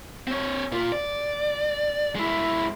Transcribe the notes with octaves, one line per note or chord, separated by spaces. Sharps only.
C4 C#5
A#2 F4
D5
G#3 E4